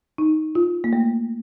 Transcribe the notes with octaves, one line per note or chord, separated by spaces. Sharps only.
D#4
F4
A#3
A3